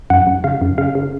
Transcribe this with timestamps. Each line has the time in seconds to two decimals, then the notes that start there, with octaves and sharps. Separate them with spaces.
0.10 F#2 F#5
0.27 F#2
0.44 C#3 F5
0.62 F#2
0.78 C#3 F5
0.95 C#3